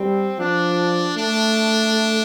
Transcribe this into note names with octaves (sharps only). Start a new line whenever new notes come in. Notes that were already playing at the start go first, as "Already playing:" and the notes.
Already playing: G3 C4
F3 D4
A3 D4